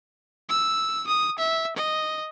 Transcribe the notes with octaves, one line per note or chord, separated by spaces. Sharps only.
E6
D#6
E5
D#5